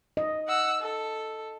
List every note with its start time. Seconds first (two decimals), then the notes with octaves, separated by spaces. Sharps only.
0.17 D#5
0.48 F#5 E6
0.82 A4